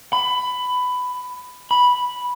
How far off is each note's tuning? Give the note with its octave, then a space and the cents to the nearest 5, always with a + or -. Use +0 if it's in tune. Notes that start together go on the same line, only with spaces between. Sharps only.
B5 +15
B5 -5